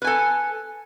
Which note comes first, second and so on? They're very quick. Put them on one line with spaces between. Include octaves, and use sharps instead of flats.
B4 G#5 A4